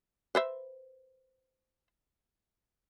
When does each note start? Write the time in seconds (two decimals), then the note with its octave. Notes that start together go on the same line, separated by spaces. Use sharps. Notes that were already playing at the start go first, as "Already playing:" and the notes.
0.35 B4 C5 E5